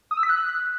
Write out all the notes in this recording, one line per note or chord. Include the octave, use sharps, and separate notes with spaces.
D#6
E6
B6
F#6